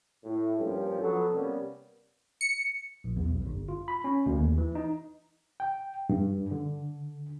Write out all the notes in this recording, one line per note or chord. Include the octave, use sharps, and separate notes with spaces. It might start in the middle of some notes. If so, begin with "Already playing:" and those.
A2
G2 F3 A#3 C#4 G4
F3 F#3 B3 A4
C3 G3 A#3 B3 C#4
C#7
A#1
E2
B1
G1
F4
B5
C#4
D2
D#2
E3
D#4
G5
G2
D3